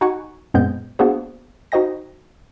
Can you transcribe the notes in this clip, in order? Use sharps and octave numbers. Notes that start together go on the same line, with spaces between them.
D#4 F#4 F#5 G#5 C#6
F#2 A#2 G#3 B3 C4 G6
A#3 B3 D4 F#4 G#4 C5
D#4 F#4 C5 D#5 G5 A#6